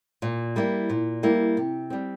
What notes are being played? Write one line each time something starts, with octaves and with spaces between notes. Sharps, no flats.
A#2
G3 A#3 E4
A#2
G3 A#3 E4
C3
G3 C4